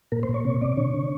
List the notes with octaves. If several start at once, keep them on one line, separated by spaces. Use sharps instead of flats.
A#2 A#4
C5
A#2
C#5
C3 C#5
C3 D5
D3 C#5
D3